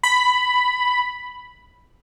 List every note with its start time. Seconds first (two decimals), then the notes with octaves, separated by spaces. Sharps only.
0.03 B5